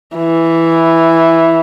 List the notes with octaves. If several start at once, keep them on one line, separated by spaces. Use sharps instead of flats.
E3